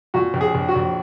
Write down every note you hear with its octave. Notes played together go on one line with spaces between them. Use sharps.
A#2 F#4
A#1
G#4
A#1
F#4
A#1